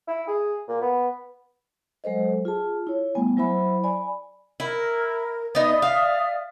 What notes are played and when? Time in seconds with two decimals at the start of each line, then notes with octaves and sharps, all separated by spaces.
0.08 E4
0.28 G#4
0.69 A#2
0.82 B3
2.04 F#3 G#3 A4 C5 D#5
2.45 F4 G#4 A5
2.87 E4 C#5
3.15 G3 A3 B3 G#5
3.37 F#3 E4 C5 E5 B5
3.84 D5 G#5 B5
4.60 E4 A#4
5.55 B3 D#4 D5 E5 D#6
5.82 F5